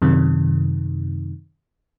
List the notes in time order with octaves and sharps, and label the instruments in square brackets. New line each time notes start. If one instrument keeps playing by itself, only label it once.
[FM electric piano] F#2 C3 D#3